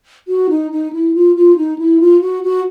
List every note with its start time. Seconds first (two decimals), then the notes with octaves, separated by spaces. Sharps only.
0.28 F#4
0.49 D#4
0.71 D#4
0.93 E4
1.14 F4
1.36 F4
1.57 D#4
1.78 E4
2.00 F4
2.21 F#4
2.43 F#4